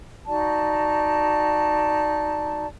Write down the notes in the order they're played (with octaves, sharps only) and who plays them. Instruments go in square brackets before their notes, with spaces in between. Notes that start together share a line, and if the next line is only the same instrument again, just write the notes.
[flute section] D#4 F#4 D5 A5